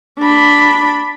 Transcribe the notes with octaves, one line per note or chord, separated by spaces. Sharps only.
D4 B5